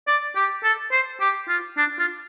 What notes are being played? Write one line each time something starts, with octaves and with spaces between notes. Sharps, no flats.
D5
G4
A4
C5
G4
F4
D4
F4